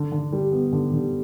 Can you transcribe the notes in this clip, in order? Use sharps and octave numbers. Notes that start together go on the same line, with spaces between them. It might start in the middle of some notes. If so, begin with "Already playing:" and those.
Already playing: D3
D3
G3
B3
D3
D3